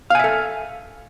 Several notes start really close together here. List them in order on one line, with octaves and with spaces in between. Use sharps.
F5 G#5 E5 A4